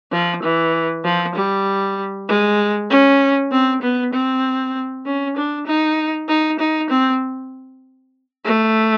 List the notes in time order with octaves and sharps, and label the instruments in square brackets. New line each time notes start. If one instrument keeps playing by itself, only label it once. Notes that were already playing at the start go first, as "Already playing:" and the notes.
[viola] F3
E3
F3
G3
G#3
C#4
C4
B3
C4
C#4
D4
D#4
D#4
D#4
C4
A3